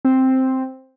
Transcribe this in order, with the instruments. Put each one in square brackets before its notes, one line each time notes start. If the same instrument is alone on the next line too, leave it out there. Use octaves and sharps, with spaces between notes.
[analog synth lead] C4